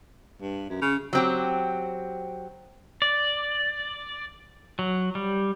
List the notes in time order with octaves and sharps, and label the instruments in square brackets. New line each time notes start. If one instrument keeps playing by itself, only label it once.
[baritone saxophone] G2
F#2
C#3
[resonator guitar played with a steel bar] F#3 C4 G4
[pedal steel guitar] D5
F#3
G3